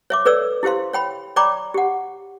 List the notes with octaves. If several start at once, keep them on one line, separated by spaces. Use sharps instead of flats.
C#5 E5 D6
A4 B4 C#5 D5 E6
E4 G4 C5 F5 C6
C#5 G5 B5
C#5 D5 G5 A#5 B5 D6
G4 F#5